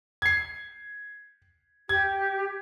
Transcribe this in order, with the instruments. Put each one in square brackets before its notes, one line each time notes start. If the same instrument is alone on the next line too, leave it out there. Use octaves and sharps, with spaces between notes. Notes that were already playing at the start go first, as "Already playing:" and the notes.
[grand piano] G#6 C7
[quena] G4 [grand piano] G#6